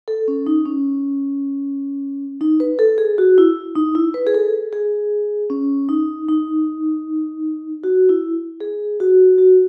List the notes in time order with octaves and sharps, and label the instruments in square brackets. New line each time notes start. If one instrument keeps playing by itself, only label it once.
[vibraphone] A4
C#4
D#4
C#4
D#4
B4
A4
G#4
F#4
E4
D#4
E4
B4
G#4
A4
G#4
C#4
D#4
D#4
F#4
E4
G#4
F#4
F#4